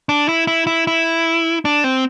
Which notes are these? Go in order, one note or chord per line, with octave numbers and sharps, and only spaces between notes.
D4
E4
E4
E4
E4
D4
C4